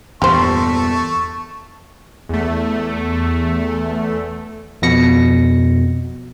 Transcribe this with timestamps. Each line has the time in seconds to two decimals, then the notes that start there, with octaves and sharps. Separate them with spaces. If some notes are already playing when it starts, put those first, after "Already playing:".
0.22 E2 G2 A#2 A3 G4 C5 A5 C#6
2.29 E2 A3
4.82 F2 B2 A#6 C#7